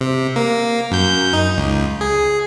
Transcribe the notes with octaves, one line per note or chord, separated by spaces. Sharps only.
C3
A#3
F#2 G6
D#4
C#2
G#4